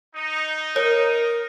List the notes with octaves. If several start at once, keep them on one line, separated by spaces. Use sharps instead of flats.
D#4
A#4 C#5